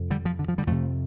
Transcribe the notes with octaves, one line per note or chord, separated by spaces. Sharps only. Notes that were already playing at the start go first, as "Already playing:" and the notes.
Already playing: F2 C3
D3 G3
F3
D3
F3
D3 G3
F2 C3 F3 A3